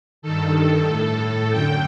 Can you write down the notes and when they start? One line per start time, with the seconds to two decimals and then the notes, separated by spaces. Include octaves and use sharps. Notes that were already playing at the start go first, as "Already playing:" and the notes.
0.22 G2 D#3 A4
0.87 A2
1.50 F#2 D3 G5